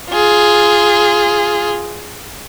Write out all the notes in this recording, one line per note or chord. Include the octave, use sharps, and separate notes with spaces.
F4 G#4